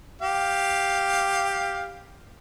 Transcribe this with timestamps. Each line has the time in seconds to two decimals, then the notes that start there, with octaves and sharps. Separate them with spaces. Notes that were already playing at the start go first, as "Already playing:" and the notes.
0.21 G4 F5